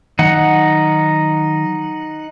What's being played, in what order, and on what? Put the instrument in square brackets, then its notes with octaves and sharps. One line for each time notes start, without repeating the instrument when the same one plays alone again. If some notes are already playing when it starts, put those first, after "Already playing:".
[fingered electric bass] D#3 F#3 [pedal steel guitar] D#4 F#5